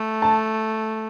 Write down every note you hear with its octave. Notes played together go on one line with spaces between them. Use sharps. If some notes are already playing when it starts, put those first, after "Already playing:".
Already playing: A3
A5